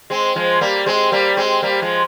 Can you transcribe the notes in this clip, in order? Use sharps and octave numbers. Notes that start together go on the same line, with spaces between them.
G#3 C4
F3 G#3
G3 A#3
G#3 C4
G3 A#3
G#3 C4
G3 A#3
F3 G#3